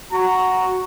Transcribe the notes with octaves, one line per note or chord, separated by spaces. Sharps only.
F#4 A#5